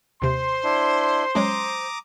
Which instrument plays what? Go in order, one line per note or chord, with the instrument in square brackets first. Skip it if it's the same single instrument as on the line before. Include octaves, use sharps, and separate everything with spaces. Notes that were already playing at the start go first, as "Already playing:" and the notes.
[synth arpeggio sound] D#2 C3 [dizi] C5 [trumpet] C6
[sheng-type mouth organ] D4 E4
[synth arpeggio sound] F#3 G#3 C#4 [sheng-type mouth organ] A#5 D6 D#6